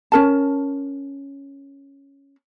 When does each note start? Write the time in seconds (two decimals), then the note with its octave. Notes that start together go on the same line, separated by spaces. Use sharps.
0.12 C#4 A#4 A5